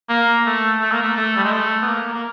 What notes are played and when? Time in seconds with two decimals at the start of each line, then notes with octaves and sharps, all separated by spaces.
0.09 A#3
0.46 A3
0.80 A3
0.92 A#3
1.02 A3
1.17 A3
1.36 G3
1.44 G#3
1.52 A3
1.82 B3
1.88 A#3
2.13 A#3